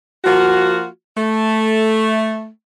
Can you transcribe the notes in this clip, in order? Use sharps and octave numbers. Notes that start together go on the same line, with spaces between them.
F3 A#3 F4 F#4
A3